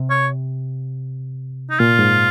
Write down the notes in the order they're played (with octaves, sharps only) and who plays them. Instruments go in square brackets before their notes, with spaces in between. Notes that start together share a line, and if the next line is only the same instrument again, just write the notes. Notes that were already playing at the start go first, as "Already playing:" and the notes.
Already playing: [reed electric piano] C3
[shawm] C#5
D#4
[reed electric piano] A#2 [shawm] F4
[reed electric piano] G#2